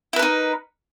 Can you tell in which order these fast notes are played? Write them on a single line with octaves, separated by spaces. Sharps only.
E4 B4 A#4 D#4